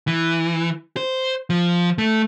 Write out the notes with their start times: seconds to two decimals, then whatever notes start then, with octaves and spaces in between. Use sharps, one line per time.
0.08 E3
0.97 C5
1.50 F3
1.98 A3